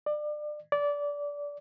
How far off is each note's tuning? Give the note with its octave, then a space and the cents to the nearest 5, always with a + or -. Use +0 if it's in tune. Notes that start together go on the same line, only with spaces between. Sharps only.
D5 +30
D5 -20